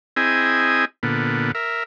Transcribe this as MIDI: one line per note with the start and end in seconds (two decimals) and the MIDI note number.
0.16 0.85 60
0.16 0.85 64
0.16 0.85 68
0.16 0.85 75
0.16 0.85 80
1.03 1.52 46
1.03 1.52 50
1.03 1.52 59
1.55 1.83 70
1.55 1.83 76